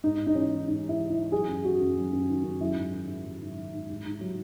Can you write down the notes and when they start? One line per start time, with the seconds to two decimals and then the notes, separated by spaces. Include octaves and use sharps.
0.04 G#2 D#4
0.19 G#2
0.27 D#4
0.35 E3 C#4
0.52 E3
0.68 G#2 D#4
0.84 G#2
0.89 E4
1.00 E3
1.10 E4
1.16 E3
1.32 F#3 G#4
1.49 F#2
1.64 D#3 F#4
1.81 F#2
1.96 F#3
2.12 F#2
2.29 D#3
2.44 F#2
2.61 F#3 E4
2.76 G#2
2.93 D#3
3.08 G#2
3.25 F#3
3.41 G#2
3.57 D#3
3.73 G#2
3.90 G#2
4.06 G#2
4.21 F#3